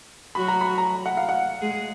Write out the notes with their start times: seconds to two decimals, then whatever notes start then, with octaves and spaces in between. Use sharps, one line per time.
0.35 F#3 F#4 B5
0.48 A#5
0.61 B5
0.78 A#5
1.06 F#5
1.17 F5
1.29 F#5
1.61 G#3 G#4